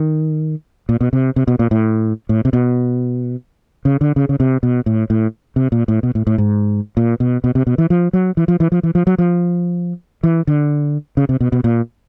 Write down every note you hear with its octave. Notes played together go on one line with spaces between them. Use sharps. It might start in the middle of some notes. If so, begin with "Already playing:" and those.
Already playing: D#3
A#2
B2
C3
C3
B2
A#2
A2
A2
C3
B2
C#3
D3
C#3
C#3
C3
B2
A2
A2
C3
A#2
A2
B2
A2
A2
G#2
A#2
B2
B2
C3
B2
E3
F3
F#3
E3
F3
E3
F3
E3
F3
F#3
F3
E3
D3
C#3
C3
B2
B2
A#2